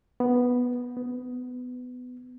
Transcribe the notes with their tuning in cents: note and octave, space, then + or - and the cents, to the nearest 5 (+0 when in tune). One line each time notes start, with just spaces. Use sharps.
B3 -5
B3 +15